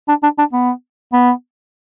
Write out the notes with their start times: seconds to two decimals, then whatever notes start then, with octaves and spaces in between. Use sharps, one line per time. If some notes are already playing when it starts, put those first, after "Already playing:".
0.08 D4
0.23 D4
0.38 D4
0.53 B3
1.13 B3